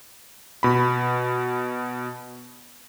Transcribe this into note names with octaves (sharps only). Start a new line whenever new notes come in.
B2 B5